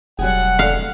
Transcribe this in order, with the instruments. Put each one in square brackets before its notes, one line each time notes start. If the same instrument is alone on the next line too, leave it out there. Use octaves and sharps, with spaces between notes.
[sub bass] E1 [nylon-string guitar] F#3 G3 G#4 [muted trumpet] F#5
[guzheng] F5